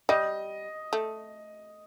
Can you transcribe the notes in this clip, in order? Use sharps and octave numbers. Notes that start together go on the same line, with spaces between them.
G3 D#5
A3